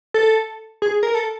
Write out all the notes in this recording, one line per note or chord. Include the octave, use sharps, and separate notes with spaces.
A4
G#4
A#4
A4